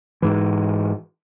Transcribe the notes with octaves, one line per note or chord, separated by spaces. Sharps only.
G#2 E3